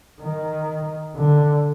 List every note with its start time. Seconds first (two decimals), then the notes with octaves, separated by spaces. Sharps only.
0.21 D#3
1.16 D3